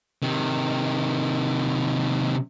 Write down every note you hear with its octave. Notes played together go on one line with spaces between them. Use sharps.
C3 D#3